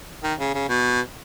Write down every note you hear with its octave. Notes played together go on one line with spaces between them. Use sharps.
D#3
C#3
C#3
B2